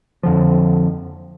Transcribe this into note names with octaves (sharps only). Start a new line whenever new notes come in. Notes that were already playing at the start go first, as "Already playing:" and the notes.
F2 D3 F3